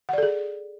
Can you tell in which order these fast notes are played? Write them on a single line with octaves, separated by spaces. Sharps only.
F#5 D5 A4 G#4